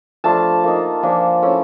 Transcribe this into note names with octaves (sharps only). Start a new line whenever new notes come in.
F3 A3 D4 F4 A5
A#3 D#4
F3 A#3 D4 G#5
A3 C#4 E4